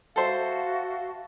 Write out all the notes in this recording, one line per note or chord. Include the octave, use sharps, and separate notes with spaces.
F#4 A4 C5 E5 F5